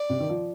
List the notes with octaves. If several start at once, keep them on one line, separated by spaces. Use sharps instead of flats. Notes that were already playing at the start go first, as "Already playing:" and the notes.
Already playing: D5
C3
D#3
F3